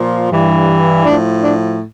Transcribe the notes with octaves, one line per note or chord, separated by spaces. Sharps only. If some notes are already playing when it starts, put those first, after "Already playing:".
Already playing: A#2 F3
G2 E3
A2 F3 D4
D4